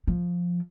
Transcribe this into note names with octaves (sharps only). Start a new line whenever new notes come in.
F3